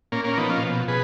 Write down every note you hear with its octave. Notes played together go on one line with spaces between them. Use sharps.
A#2 A#3 C#4
A#3 C#4
F3 B3 D#4
C#4 F4
B2
B2 G#4 B4